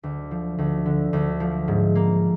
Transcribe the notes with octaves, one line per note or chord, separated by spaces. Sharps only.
D2
F3
D2
D3
D2
F3
G#2
A#3